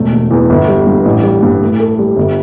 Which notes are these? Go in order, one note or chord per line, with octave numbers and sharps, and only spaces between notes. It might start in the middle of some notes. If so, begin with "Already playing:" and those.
Already playing: E1 A3
E1
E2
G1
G3
G2
A1
G3
G2
A2
A4
G3
G1